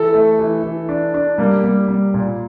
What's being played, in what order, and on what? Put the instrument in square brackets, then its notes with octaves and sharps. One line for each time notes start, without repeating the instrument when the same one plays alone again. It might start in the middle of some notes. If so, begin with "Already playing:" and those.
Already playing: [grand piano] E3 [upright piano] A4
[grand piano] A3
E3
E3
D4
D4
[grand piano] G3 [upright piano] A#3
[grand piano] G3
G3
A#2